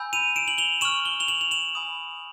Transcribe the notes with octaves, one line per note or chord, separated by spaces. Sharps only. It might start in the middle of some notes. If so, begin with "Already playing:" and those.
Already playing: G#5 B5 E6 G6
D#7 F7
D7 E7
F#7
F7 G7
C#6 F6 E7 F#7
G7
F7 G7
E7 F#7
F7
E7 F#7
G#5 B5 D#6